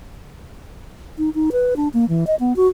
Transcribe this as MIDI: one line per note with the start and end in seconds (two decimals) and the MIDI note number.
1.18 1.30 63
1.35 1.50 63
1.52 1.74 71
1.76 1.88 62
1.94 2.08 58
2.09 2.27 52
2.27 2.35 75
2.40 2.56 59
2.56 2.68 66